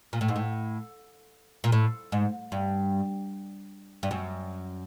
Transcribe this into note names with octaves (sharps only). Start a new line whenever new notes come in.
A#2
A2
G#2
A2
A#2
A2
G#2
G2
G2
F#2